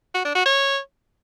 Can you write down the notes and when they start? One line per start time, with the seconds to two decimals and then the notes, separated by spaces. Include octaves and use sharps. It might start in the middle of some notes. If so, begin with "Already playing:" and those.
0.14 F#4
0.25 D4
0.35 F#4
0.46 C#5